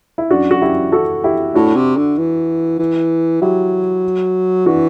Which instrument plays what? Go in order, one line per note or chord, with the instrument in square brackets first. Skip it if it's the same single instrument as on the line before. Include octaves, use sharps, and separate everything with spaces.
[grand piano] E4
[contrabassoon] F#2 [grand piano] D4 F#4
[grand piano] F#4
E4 G4
F#4 A4
E4 G4
[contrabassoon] A2 [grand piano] D4 F#4
[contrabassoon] C3
D3
E3
E3
[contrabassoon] F#3 [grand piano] E4 G4
[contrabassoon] E3 [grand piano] D4 F#4